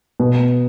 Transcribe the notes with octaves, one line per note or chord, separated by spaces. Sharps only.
B2